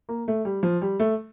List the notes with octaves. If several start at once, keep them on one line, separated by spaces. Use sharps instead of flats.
A#3
A3
G3
F3
G3
A3